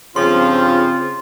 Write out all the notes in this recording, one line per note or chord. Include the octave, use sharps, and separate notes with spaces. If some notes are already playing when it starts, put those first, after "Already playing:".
G2 C#3 F3 C4 F4 C6